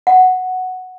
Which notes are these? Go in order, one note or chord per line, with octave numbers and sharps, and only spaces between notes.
F#5